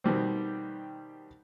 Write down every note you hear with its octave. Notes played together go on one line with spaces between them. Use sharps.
B2 D#3 G3 C4